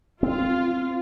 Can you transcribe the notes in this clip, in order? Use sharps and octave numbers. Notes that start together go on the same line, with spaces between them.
C4 F4